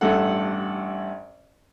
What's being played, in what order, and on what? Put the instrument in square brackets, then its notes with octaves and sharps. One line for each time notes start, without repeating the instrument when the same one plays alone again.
[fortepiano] A1 G2 A4 F#5